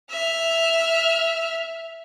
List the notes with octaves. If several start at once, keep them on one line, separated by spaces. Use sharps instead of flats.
E5 F6